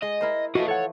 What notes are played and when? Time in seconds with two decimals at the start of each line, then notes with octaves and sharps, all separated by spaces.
0.02 G#3 D#5
0.21 E4 A#4 C5
0.55 E3 F3 A3 F#4 D#5 F#5
0.68 A4 C#5 F#5